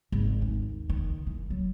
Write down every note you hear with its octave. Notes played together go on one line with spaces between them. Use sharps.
G#1
D#2
D#3
E3
F#3